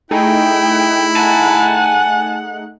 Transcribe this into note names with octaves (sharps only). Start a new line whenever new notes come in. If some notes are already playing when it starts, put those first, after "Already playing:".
A3 D#4 E4 G#4 G5
F#5 G#5 A5